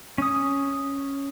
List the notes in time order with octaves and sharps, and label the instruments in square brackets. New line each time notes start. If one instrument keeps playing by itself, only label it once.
[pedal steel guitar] C#4 D#6